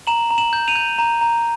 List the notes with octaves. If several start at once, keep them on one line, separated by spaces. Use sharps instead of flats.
A#5 E7 F#7
A#5
E7 F#7
G6
D#7 F7
G6
A#5
A#5